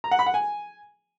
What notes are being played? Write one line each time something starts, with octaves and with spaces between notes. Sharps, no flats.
A#5
F#5
B5
F#5
G#5